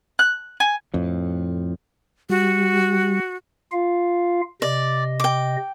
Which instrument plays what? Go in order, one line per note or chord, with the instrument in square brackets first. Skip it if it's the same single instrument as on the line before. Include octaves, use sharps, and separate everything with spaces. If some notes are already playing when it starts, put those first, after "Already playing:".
[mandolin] F#6
G#5
[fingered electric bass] F2 A2
[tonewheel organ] G3 [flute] F#4
[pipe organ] F4 F5
[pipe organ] C3 D#5 [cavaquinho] D5
[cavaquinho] G5 D6